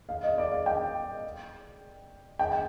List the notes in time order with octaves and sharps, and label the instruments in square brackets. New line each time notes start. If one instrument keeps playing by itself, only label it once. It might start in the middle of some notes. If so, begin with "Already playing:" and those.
[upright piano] F5
D#5
D5
F5
G5
G5
G5